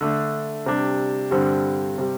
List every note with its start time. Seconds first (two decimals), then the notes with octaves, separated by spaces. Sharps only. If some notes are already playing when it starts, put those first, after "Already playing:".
0.01 D3 A3 D4
0.66 C3 G3 D4
1.31 G2 D3 G3 C4
1.98 C3 G3